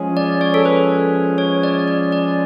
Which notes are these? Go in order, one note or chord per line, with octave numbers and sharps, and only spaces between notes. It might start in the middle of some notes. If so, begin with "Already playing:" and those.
Already playing: F3 G#3 C#4 G#4
D5
C#5
A4
B4
C#5
D5
D5
D5